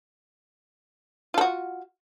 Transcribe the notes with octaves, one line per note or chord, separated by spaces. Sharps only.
F4 F#4 A4